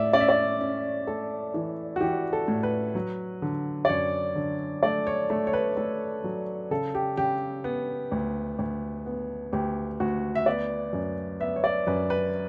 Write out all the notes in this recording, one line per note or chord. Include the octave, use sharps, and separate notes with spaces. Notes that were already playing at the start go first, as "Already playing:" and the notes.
Already playing: A2 A3 D5 E5
C#4 D5
E5
D5
C#4
A3 A4
E3
F#4
E3 G4
A4
A2
B4
F#3
D3
D5
F#2 C#5
D3
A3 D5
C#5
A3
C#5
B4
A3 A4
F#3
C#3 A4
G4
C#3 G4
B3
D2
D2
B3
D2 G4
D2 F#4
E5
B3 D5
F#2
B3 E5
C#5
D5
F#2 B4
B4